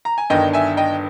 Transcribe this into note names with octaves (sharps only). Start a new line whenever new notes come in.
A#5
G#5
G1 G2 D#3 D#5 G5
E5 G#5
D#5 G5